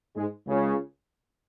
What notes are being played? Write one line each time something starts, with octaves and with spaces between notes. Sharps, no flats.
G#2 G#3
C#2 C#3